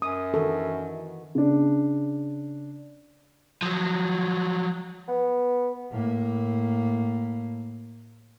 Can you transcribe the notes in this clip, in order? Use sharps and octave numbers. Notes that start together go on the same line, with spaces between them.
F#2 D#6
D#3 E3 F#4 A4
C#3 D4
F3 F#3
B3
A2 A#3